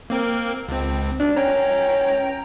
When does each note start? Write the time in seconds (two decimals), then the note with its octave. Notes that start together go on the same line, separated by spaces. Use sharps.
0.10 A#3 C4 A#4
0.68 C#2 C4
1.20 D4
1.37 C#4 G5 A#5